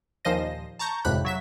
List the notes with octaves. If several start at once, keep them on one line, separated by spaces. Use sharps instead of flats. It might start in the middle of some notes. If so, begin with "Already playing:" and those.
D#2 A#2 F3 C5 D#5 A#6
A5 A#5 C#6 G6
G#1 F2 A2 C3 B5 F#6
F#3 E5 B6